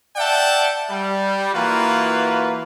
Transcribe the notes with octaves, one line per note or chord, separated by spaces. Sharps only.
D5 E5 F#5 G5 A5
G3
E3 A#3 F4 F#4 B4